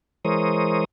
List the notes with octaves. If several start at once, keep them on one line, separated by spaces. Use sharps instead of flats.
E3 G#3 A#4 C5 C#5 D#6